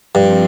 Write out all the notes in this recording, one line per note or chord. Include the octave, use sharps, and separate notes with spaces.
G2 F3 C4